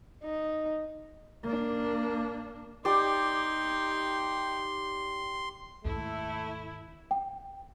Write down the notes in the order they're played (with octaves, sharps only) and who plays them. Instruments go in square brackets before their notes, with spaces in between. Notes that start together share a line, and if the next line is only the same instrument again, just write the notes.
[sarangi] D#4
[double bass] A#3 D4
[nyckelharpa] D#4 G5 [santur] G4 D5 [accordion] C6
[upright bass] D#2 G#2 [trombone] A3 [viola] E4
[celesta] G5